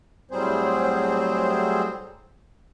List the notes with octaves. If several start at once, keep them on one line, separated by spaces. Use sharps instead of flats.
A2 F#3 G3 C4 G#4 C5